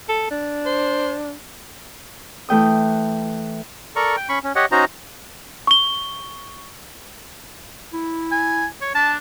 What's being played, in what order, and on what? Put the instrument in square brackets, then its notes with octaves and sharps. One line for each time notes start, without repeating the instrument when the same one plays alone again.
[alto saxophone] A4
D4
[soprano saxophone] C5
[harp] E3 A3 G5 D#6
[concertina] A4 A#4 D5 A#5 C#6
G5
C#4 B5 C#6
C#4
G4 C#5 D#5 F#5
C#4 D#4 F#4 C5 D#5 A#5
[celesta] C#6 G7
[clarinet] E4
[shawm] G#5
C#5
[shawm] D4 [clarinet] A5